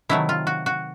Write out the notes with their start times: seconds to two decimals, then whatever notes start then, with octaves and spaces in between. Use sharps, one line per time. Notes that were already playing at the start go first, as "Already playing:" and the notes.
0.09 C3 D#3 F#3 A3 E4
0.29 F4
0.47 F#4
0.66 F#4